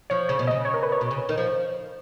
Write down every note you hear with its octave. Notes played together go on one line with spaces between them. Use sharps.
F3 C#5
C#3 C#5
B2
D#5
C#3
C#5
A#4
B4
C#5
B2
C#3
D#3
F3